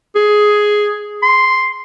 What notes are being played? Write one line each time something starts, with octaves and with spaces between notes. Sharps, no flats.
G#4
C6